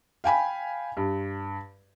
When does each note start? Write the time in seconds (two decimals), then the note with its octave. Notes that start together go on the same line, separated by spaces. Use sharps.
0.24 F5 G5 G#5 B5
0.97 G2